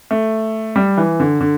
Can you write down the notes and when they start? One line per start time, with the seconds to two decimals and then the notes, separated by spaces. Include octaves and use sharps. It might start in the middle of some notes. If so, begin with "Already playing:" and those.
0.11 A3
0.76 G3
0.97 E3
1.20 D3
1.41 D3